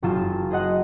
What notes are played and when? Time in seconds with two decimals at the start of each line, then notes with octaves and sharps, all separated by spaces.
0.03 F#1 F#3 F4 A5 E7
0.50 G#4 C5 D#5 F#5